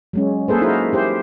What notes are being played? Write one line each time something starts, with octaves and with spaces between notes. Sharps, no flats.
F#3 G#3 C#4
A#3 G#4 A4 B4 C5
D#4 E4 F#4 A4 A#4 C5
E4 G4 C5